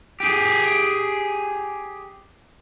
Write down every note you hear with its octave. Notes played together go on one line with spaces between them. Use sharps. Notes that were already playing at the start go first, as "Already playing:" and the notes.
G4 G#4